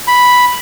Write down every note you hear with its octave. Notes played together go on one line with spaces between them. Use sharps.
B5